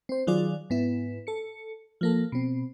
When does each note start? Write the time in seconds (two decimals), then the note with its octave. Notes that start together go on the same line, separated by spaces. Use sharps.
0.09 C4 C5
0.27 D#3 F#3 F4 G#4 D5
0.70 G#2 B3 E4
1.27 A4 C#7
2.01 F3 A#3 A4
2.32 B2 C4